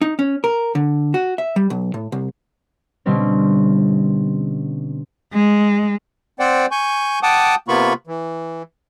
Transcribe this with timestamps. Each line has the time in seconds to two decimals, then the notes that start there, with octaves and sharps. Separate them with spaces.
0.02 D#4
0.19 C#4
0.44 A#4
0.75 D3
1.14 F#4
1.38 E5
1.56 G3
1.70 B1
1.94 A2
2.12 C2
3.06 B2 D3 G3 C4 C#4
5.32 G#3
6.39 C4 C5 D5 F#5 G5
6.71 G#5 C#6 G6
7.23 F#5 G5 A5 D6 D#6
7.68 C3 A#3 B3 F4 B5 C#6
8.07 E3